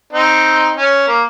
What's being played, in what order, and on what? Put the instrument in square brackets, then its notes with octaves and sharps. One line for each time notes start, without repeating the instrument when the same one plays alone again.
[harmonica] C4 D#4
C#4
A#3